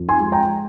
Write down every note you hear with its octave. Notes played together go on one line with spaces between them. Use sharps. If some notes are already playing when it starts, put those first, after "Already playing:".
Already playing: F2
G#5 C6
G#3
G5 A#5